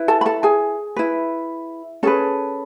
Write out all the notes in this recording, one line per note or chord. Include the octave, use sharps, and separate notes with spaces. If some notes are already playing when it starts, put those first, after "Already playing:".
Already playing: E4 B4
A4 A5
B5
A4 A5
G#4 G#5
E4 B4
C#4 G#4 A4 B4 A5